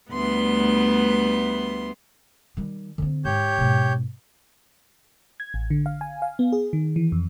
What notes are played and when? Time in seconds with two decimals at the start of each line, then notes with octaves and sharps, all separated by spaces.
0.11 D2 G3 A3 B3 B4 C6
2.57 D#3 G3
2.98 D3 C4
3.25 G#2 G4 C#5 G6
3.59 G#2 B2
5.40 G#6
5.54 A1
5.70 D3
5.86 F5
6.01 G#5
6.22 F5
6.39 B3
6.52 G#4
6.73 D#3
6.96 E3
7.12 F2